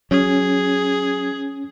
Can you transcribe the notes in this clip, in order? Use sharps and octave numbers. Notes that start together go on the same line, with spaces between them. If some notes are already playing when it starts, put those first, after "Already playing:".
F#3 C#4 G#4